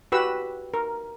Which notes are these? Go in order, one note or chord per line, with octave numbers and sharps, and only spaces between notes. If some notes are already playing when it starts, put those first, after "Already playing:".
F#4 G4 B4 E6
A#4